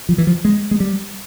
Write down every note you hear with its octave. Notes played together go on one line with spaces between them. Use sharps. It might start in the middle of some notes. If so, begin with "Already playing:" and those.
F3
E3
F3
G#3
G#3
G3